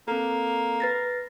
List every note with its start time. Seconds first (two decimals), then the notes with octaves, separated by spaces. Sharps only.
0.08 A#3 C4 A4
0.80 B4 A6 A#6